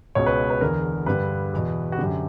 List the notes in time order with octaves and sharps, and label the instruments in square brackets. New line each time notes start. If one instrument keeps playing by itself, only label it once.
[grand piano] C#2 B2 C#5
B4
B4
E2 D3 A#4
G2 D3 B4
E2 B2
F#4
F#2 D3 G4